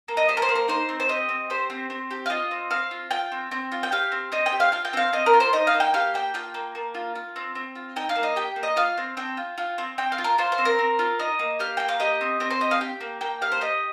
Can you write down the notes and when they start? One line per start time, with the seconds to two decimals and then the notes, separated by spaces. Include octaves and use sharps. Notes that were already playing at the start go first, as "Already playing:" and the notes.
0.08 A#3
0.17 D#5
0.28 G4 C5
0.37 A#4
0.42 C5
0.49 A#3
0.55 A#4
0.68 D#4 C5
0.89 C4
1.00 C5
1.09 G4 D#5
1.29 C4
1.50 G4 C5
1.70 C4
1.90 C4
2.11 G4
2.26 F5
2.30 F4 D#5
2.51 C4
2.71 C4 F5
2.91 F4
3.11 F4 G5
3.32 C4
3.51 C4
3.72 F4
3.83 G5
3.92 G4 F5
4.12 C4
4.32 C4 D#5
4.46 G5
4.52 G4
4.60 F5
4.72 F4 F5
4.85 G5
4.93 C4 F5
5.13 C4 D#5
5.26 A#4
5.33 F4
5.40 C5
5.53 D#4 D#5
5.67 F5
5.74 A#3
5.80 G5
5.94 G4 F5
6.14 A#3 G5
6.34 F4 G5
6.54 A#3
6.75 A#3
6.95 F4
7.15 F4
7.36 C4
7.55 C4
7.75 F4
7.96 D#4 G5
8.09 F5
8.16 A#3
8.23 D#5
8.36 G4 G5
8.56 A#3
8.63 D#5
8.76 F4 F5
8.97 C4
9.17 C4 G5
9.37 F4
9.58 F4
9.78 C4
9.98 C4 G5
10.12 F5
10.18 F4
10.24 A#4
10.38 F4 C5
10.52 C5
10.58 C4
10.65 A#4
10.79 C4
10.99 F4
11.19 D#4 D#5
11.39 A#3
11.59 G4 F5
11.77 A#3 G5
11.88 F5
12.00 G4 D#5
12.21 C4
12.40 C4 D#5
12.50 C5
12.61 G4 D#5
12.71 F5
12.81 G4 G5
13.00 A#3
13.21 A#3 G5
13.41 G4 F5
13.52 C5
13.61 G4 D#5